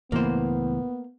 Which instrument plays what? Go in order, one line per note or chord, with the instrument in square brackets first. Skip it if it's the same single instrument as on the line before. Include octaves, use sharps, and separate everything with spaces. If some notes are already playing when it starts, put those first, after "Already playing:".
[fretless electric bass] C#2 A2 E3 [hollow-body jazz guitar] A#3 C5 [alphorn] B3